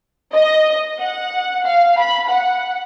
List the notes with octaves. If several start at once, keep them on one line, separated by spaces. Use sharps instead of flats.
D#5
F#5
F5
B5
F#5